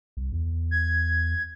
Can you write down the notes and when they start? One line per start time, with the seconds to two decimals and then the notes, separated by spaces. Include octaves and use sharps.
0.17 C2
0.32 E2
0.71 G#6